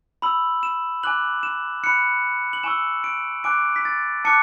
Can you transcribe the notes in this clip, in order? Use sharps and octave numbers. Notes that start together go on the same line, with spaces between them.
B5 E6 F#7
E7
G#5 D6 F#6 F#7
E7
B5 F#6 C#7
F#7
G#5 C#6 E6 E7
D7
G#5 D6 F#6 D7
B6
A6
A5 D6 F#6 C#7